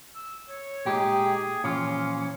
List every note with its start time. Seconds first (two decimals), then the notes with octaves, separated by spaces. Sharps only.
0.16 E6
0.50 C#5
0.86 A#2 G#3 D#4 G4 G#4
1.64 A#2 E3 F3 C#4 F4